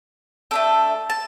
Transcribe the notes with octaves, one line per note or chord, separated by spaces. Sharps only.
A3 D4 A4 G5
A5